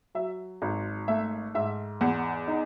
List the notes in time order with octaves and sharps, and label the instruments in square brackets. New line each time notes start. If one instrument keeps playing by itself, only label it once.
[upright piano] F#3 E5
G#1
A3 E5
G#2 E5
E2 F#5
D#4